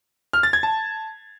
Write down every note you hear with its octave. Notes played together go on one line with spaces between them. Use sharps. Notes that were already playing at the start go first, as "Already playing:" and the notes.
F6
A6
G#6
A5